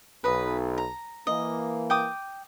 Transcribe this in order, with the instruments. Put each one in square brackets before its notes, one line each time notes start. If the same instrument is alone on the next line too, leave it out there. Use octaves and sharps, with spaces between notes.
[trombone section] B1 [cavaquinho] B4 D#5
[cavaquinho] A#5
[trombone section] E3 A#3 [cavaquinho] D#5
[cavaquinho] G5 D6 D#6